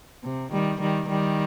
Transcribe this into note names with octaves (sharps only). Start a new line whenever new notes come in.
C3
D#3 G3
D#3 G3
D#3 G3